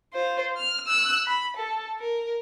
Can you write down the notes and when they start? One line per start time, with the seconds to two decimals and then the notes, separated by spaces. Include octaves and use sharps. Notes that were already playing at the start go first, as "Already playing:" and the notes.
0.13 F4 C5
0.56 F6
0.87 E6 F#6
1.26 B5
1.57 A4
1.99 A#4